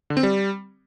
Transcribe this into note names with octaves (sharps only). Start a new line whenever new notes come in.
D3
C4
G3